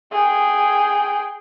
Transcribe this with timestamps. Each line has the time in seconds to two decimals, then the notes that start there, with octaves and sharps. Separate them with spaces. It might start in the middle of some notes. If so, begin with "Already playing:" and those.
0.12 G#4 G5